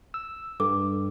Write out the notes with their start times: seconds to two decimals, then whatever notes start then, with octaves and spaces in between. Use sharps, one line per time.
0.14 E6
0.60 G2 A4 D6